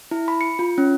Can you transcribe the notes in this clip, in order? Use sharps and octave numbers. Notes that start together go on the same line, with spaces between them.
E4
B5
C#7
F4
C#4